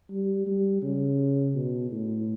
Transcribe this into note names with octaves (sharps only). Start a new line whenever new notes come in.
G3
G3
C#3
B2
A2